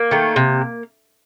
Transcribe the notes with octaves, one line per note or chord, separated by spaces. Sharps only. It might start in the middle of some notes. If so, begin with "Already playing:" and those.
Already playing: A#3
D#3 A3
C3